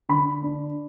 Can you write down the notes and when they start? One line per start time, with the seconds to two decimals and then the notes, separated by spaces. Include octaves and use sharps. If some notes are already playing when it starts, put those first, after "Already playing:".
0.09 D3 B5
0.43 D4